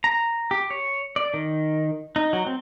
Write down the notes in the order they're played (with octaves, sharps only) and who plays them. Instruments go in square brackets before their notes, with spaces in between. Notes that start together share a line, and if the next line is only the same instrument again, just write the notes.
[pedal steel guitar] A#5
G4
C#5
D5
D#3
D#4
F#3
C4